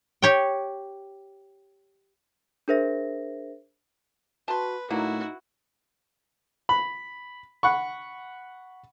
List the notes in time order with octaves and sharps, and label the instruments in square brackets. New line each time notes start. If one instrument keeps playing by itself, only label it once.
[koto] G4 C#5 G5
[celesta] D4 G#4 A#4 C5 E5 A#6
[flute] F#4 [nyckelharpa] B4 [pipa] A5 C6
[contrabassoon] A2 [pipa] D3 F#3 A#3 [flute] D#4 [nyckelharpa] E4 F#4
[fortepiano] B5
F#5 B5 C#6